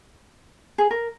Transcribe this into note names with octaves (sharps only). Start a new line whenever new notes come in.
G#4
A#4